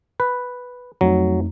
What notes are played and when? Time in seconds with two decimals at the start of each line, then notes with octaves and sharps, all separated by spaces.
0.20 B4
1.01 F2 F#3 A3 D#4